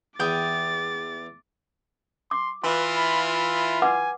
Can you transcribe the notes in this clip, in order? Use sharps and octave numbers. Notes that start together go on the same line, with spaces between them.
E2 E4 G5 D6 D#6 A6
C6 D6
E3 E4 F4 B4 C6
B5
B5
B4 F#5 G#5 D6